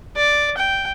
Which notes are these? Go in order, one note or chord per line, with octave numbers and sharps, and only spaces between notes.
D5
G5